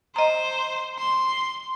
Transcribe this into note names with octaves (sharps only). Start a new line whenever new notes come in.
C5 D#5 A#5
C6